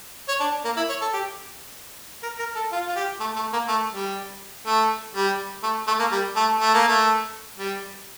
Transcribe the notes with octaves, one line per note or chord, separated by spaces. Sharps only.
C#5
D4
A#3
E4
C#5
A4
G4
A#4
A#4
A4
F4
F4
G4
A3
A3
A#3
A3
G3
A3
G3
A3
A3
A#3
G3
A3
A3
A#3
A3
G3